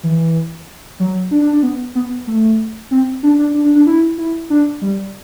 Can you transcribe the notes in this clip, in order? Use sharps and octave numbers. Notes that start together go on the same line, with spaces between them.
E3
F#3
D4
D4
D4
B3
B3
A3
C4
D4
D4
D4
D4
D4
E4
E4
D4
G3